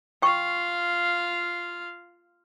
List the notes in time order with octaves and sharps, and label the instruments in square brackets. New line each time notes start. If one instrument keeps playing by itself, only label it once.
[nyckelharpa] F4 F5 [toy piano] G5 C#6